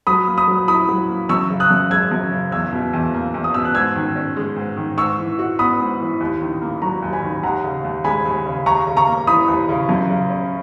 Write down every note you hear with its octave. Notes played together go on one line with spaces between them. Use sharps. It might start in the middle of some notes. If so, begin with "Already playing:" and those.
F#3 B5 D#6
A#3
B5 D#6
F#3
E4 B5 D#6
F#3
A#3
F#2 C#6 E6
C#3
D#6 F#6
F#2
G#3 E6 G#6
F#2
C#3
E2 E6 G#6
B2
E2
A#3
E2
D#6
B2 E6
F#6
G#2 E6 G#6
D#3
C#4
G#3
G#2
D#3
G#2 C#6 E6
E3
F#4
B3 B5 D#6
G#2
E3
D#2
D#3
A#3
F#3 A#5 C#6
D#2
G#5 B5
D#3
D#2 F#5 A#5
C#3
D#2
G#3 G#5 B5
D#2
C#3
D#2 A#5 C#6
C#3
A#5 C#6
A#3
E3 B5 D#6
D#2
C#3
F#2
C#3
C#4